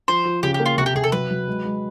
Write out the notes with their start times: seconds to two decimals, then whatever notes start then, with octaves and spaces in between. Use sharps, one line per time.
0.08 F3 C5
0.25 F3
0.43 C#3 G4
0.54 G4
0.60 A#3
0.66 F4
0.78 C3 F#4
0.86 G4
0.95 C3 G#4
1.04 A4
1.12 F#3 B4
1.31 F#3
1.48 G#3
1.65 G#3